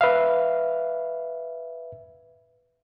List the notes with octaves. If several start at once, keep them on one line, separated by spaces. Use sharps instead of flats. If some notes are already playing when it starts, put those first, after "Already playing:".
B4 E5 F5